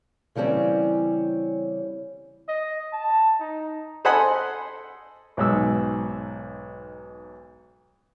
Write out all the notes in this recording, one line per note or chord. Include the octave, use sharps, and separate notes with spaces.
C#3 E3 G3 C4 C#4
D#5
A5
D#4
A4 C5 D#5 F#5 G#5 B5
B1 G#2 E6